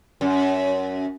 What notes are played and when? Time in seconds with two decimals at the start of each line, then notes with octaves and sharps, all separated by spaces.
0.21 F#2